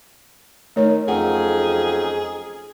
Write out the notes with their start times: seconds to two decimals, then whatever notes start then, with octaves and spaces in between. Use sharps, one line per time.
0.76 D#3 A3 C#5
1.08 F2 F#3 C#4 D#4 G#4 F#5